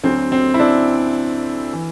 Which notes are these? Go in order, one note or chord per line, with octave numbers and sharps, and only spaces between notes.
D2 D3 F#3 C4
C4
E4
D4
E3